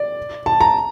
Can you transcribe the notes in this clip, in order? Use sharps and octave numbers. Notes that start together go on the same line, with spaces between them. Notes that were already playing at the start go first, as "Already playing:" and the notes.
Already playing: D5
A5
A#5